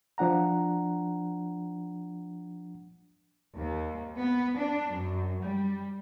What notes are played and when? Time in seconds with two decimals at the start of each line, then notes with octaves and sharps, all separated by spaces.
0.18 F3 D4 F#5 A#5
3.56 D#2
4.19 B3
4.58 D4
4.94 F#2
5.41 G3